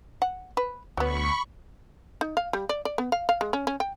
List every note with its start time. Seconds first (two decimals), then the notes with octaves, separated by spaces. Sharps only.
0.22 F#5
0.57 B4
0.97 D2 F#3 B3 B5 C#6
2.21 D#4
2.37 F5
2.53 G3
2.69 D5
2.85 D5
2.98 B3
3.12 F5
3.29 F5
3.41 G#3
3.53 C#4
3.67 C#4
3.80 G5